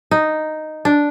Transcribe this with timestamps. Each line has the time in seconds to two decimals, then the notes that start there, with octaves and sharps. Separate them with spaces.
0.11 D#4
0.85 D4